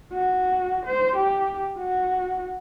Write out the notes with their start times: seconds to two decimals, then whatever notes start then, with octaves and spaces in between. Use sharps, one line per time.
0.13 F#4
0.86 C5
1.17 G4
1.78 F#4